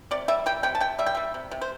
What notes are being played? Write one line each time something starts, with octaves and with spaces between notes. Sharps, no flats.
C3 D5
G3 E5
G3 G5
C3 G5
A5
C3 G5
G3 E5
G5
G3 E5
C3
C3
C5